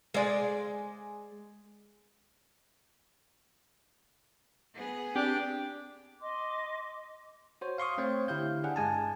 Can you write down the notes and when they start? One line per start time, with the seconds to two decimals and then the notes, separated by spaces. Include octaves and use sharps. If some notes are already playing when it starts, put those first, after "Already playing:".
0.14 G#3 D5
4.74 B3 G#4
5.15 C4 D4 G4
6.20 D#5 C6 D6
7.61 F#4 C5 C#5
7.78 F5 C6 C#6 D#6
7.98 A3 C4 C5 C#5 F5
8.28 D3 E4 G4 F5 G6
8.64 D4 G#4 F#5
8.76 G2 G#3 G#5 A5